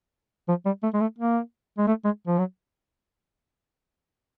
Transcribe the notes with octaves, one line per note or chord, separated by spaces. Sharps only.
F3
G3
A3
G#3
A3
A#3
G#3
A3
G#3
F3
F#3